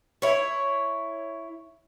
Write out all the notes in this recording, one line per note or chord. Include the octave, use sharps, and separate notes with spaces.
E4 C#5